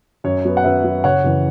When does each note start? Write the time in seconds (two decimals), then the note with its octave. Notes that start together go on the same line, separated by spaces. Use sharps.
0.24 F#2 C#5
0.45 F#3 B3
0.57 F#5
0.64 F#2 B4 E5
0.84 F#3 B3
1.04 F#1 C#5 F#5
1.24 F#2 C#3 E3